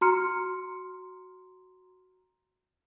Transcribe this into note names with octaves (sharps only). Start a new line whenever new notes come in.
F#4 A#5 C6 F6 C#7